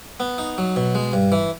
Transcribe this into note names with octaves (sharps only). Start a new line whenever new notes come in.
B3
D#4
F#3
B2
G#3
G2
E3